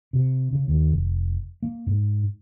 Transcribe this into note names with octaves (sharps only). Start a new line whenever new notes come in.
C3
C#3
D#2
F1
A#3
G#2